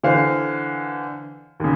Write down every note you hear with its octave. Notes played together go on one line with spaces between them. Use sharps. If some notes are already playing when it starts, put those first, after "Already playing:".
D3 E3 C5 F5
D#2 C#3